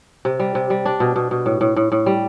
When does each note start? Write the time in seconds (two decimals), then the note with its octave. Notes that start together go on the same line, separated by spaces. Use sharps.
0.25 C3
0.40 G3
0.55 C3
0.70 G3
0.86 D4
1.00 B2
1.16 B2
1.31 B2
1.46 A2
1.61 A2
1.76 A2
1.92 A2
2.06 G3